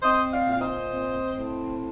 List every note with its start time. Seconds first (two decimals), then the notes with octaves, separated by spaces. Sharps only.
0.03 C4 C5 D#5
0.32 D5 F5
0.47 A#2 F5
0.61 C5 D#5
0.90 C4
1.35 A2